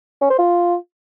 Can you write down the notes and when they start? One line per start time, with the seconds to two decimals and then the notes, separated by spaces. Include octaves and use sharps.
0.21 C#4
0.30 C5
0.38 F4